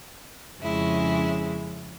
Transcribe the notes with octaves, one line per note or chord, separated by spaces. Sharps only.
F2 C#3 G#3 C#4 E4